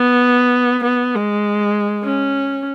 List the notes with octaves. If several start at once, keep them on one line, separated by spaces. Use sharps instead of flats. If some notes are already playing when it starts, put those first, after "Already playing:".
Already playing: B3
B3
G#3
C#4